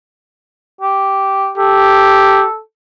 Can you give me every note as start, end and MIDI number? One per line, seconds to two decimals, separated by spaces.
0.81 1.52 67
1.58 2.45 67
1.58 2.59 69